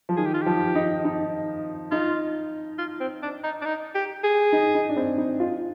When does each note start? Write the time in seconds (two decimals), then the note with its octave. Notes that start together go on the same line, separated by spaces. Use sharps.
0.09 F3
0.17 D#3 G#4
0.26 G4
0.34 F4
0.42 F3 G4
0.75 D#4
1.05 D#4
1.91 D#4 F4
2.78 F4
3.00 C4
3.22 D4
3.44 D#4
3.62 D4
3.65 D#4
3.95 G4
4.24 G#4
4.53 D#4
4.75 D#4
4.89 D4
4.97 C4
5.18 D#4
5.40 F4